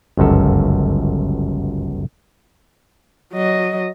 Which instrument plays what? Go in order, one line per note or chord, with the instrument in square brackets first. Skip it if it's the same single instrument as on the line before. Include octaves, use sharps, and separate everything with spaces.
[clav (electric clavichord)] G1 C#2 F#2 A4
[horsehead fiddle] F#3 D#5